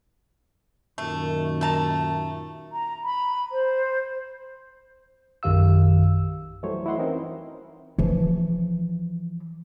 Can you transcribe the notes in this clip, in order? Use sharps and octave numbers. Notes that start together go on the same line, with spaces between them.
F#2 A#2 D#3 A3
A3 A5 A#5
A#5
B5
C5
A#1 F#2 D#3 G4 F5 E6
E3 F#3 G3 A3 C5 C#5
E4 D#5 F#5 C6
E3 C4 C#4 D#4 A#4
E3 F3